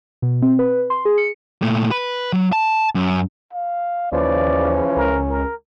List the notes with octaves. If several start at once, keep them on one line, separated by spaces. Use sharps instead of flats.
B2
C4
B4
C6
G#4
C#7
A#2 A3
B4
F#3
A5
F#2
F5
D#2 C#3 E3 F3 C#4 D5
C#2 A#4
A#4